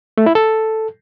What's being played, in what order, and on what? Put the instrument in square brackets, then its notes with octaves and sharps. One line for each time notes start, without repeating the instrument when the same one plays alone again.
[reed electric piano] A3
E4
A4